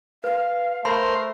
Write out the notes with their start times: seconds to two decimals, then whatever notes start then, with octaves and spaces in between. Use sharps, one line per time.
0.24 B4 F5
0.85 A3 A#4 C5 B5 C6